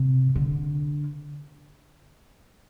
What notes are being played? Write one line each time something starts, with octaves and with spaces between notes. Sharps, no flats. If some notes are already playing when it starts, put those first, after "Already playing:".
Already playing: C3
D3